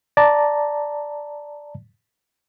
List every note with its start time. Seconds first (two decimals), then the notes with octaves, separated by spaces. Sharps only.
0.17 D5 A5 A#5